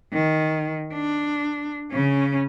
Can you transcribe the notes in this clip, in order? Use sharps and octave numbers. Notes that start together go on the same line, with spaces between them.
D#3
D4
C#3 C#4